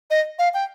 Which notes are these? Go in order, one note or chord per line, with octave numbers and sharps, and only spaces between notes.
D#5
F5
G5